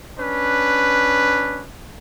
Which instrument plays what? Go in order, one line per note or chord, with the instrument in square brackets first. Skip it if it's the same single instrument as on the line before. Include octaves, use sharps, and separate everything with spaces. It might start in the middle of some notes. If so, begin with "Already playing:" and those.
[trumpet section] C#4 D4 B4